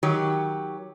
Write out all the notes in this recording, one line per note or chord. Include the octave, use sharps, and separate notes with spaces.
D#3 F#3 G4 C#5